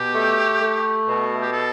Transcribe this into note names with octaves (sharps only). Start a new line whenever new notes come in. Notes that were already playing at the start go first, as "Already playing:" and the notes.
Already playing: B2 G4
A3
A3
B2
G4
A4